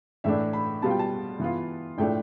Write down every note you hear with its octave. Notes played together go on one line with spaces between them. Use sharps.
A2 E3 A3 D4 E5
B5
B2 G3 B3 F4 A5
G5
A5
E3 B3 F4
A2 F3 A3 D4 G5